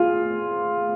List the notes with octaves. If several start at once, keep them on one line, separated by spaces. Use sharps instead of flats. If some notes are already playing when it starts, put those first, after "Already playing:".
Already playing: F4 G#4